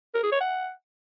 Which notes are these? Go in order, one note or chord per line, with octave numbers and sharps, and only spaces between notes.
A#4
G#4
C#5
F#5